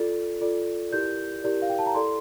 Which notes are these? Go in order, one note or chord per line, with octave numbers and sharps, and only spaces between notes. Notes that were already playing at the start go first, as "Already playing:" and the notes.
Already playing: F4 A4 D5 A6
F4 A4 D5
E4 G4 A#4 D5 G6
E4 G4 A#4 D5
F5
G5
A5
A#5
E4 A4 D5 C6